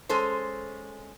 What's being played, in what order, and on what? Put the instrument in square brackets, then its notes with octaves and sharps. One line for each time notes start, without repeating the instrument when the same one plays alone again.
[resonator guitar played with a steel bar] G#3 C#4 A4 C5